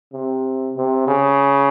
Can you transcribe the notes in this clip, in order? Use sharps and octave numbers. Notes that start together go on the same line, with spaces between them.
C3
C3
C#3